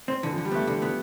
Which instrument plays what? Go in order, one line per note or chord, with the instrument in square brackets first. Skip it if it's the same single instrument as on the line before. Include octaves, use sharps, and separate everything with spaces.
[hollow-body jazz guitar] C4
[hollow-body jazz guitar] D3 [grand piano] E3
[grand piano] F3
[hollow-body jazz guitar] D3
[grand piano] G3
[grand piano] A3 [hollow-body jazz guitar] B3
[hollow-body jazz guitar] D3 [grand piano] E4
[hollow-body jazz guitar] B3